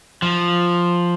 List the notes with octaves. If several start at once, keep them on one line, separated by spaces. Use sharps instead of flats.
F3